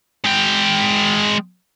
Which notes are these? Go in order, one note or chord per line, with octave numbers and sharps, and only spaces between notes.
G#3 G5